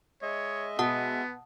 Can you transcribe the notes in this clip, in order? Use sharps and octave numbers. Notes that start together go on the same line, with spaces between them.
G#3 C#5 D#5 E5
B2 B3 F#5 A5 D#6